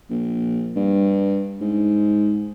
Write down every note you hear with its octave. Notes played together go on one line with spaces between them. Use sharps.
A#1
G2
G#2